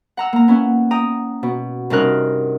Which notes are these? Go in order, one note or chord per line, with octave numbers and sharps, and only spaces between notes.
F#5 A#5 E6
A#3 A#5
B3 C#4 E4
G5 A#5 D#6
B2
G2 C3 C#4 D#4 A#4 F#6